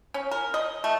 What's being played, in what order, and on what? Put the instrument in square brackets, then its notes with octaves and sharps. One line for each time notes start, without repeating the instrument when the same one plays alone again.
[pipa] C#4
A#4
D#5
A3